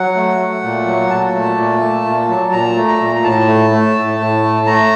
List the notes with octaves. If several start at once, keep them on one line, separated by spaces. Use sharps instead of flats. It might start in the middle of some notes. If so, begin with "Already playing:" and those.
Already playing: F#3 F#5
A3
A3
A#2
F#3
A#2 A5
A3
A#2
A3
A#2
F#3
A#2 A#5
A3
A#5
A#2
A#5
A2 A5
A3
A3
A2
A2
A3
A3 A#5